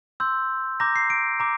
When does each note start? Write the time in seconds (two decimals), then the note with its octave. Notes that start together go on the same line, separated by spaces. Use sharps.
0.20 C6 E6 G6
0.80 A#5 D6 G6 A#6
0.96 C7
1.10 D7
1.40 A#5 D6